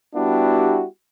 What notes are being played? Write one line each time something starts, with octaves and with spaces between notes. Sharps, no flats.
G3 B3 D4 E4 F#4 G4